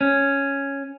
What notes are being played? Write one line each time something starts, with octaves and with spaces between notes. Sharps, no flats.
C#4